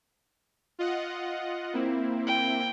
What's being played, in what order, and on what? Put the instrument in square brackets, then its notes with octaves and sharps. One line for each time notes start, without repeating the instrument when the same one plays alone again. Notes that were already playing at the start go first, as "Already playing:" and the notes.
[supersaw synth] F4 D#5 F#5
A#3 C4 E4
[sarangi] G5